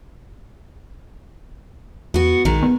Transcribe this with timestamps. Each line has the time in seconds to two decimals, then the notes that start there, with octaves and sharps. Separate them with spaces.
2.14 E2 B3 F#4
2.45 A#1 D#3 G#3
2.62 B3